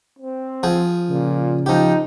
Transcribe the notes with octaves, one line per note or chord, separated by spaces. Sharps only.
C4
F3 G#4
A#2 C#3
F3 D#4 G4